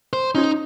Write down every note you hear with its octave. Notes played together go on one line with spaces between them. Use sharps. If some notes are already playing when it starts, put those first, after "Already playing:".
C5
C#4 D#4 F4 G#4